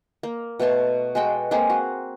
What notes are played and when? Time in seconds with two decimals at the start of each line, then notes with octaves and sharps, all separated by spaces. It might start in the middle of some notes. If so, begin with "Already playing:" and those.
0.23 A#3
0.60 B2 A3 A5 C6
1.15 G#3 F#4 A4 G5
1.51 G#3 A#3 C4 G#4
1.70 F#4